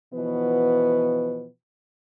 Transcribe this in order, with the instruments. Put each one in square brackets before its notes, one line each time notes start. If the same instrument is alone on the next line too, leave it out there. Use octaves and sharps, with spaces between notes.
[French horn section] B2 E3 F3 B3